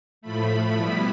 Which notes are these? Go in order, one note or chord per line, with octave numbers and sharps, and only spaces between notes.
A2 F3 A3 B5
B2 G3 B3 E4